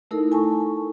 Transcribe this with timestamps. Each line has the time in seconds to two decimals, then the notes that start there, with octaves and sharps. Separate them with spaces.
0.11 A3 D#4 E4 A4 A#4
0.32 G#5 A5 C#6